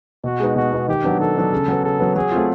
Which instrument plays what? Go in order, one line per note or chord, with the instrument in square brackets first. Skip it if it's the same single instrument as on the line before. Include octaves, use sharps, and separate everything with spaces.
[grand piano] B2 [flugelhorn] F#4
[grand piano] G#3 B3 D#4
[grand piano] B2 [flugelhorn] F#4
[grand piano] G#3 B3 D#4
[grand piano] D#3 [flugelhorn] G4
[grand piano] F#3 B3 D4
[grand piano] D#3 [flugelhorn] A4
[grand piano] F#3 B3 D4
C#3
F#3 B3
[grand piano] C#3 [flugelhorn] A4
[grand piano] F#3 B3
[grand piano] F#3 [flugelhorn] G#4
[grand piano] A3 C4 F4